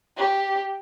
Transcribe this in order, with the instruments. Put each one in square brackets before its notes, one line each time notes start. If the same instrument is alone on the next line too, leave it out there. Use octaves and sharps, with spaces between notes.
[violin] G4